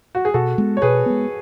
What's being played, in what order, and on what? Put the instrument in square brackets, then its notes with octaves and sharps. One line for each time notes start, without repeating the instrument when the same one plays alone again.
[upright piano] F#4
G#4
[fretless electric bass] B2 [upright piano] F#4 A4
[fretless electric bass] G#3 B3
[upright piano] C#5
[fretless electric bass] B2 [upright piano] G#4 B4
[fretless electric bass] G#3 B3